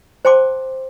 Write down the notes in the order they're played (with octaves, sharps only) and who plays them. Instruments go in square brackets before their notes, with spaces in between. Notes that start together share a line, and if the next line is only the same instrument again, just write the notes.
[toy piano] C5 G5 A5 C6 D6